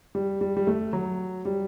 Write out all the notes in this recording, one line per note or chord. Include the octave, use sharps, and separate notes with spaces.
G3
G3
G3
A3
F#3
G3